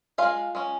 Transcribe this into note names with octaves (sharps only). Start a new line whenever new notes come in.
G#3 C#4 F4 F5
G#3 C#4